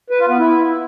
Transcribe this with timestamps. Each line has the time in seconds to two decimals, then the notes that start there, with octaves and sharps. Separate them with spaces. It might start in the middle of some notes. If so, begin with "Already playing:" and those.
0.10 B4
0.19 F4
0.29 B3
0.38 E4